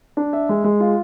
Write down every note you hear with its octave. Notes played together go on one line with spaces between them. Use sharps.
D4
E5
G#3
G#3
F4